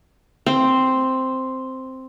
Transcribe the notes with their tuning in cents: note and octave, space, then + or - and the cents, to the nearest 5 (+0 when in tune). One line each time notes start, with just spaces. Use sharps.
C4 +0 C5 +0